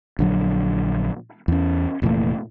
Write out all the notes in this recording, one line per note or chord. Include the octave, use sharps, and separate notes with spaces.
A#1 D3 F#3
E2 C#4
F1 A#2 E3 A3